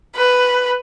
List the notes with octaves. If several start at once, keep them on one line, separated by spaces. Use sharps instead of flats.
B4